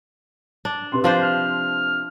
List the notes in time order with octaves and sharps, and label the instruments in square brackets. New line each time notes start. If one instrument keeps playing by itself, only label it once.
[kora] D4
[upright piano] C3 B4 C6
[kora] F3 D4 C5
[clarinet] F6